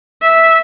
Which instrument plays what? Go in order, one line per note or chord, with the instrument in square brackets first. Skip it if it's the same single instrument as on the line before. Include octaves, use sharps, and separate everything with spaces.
[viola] E5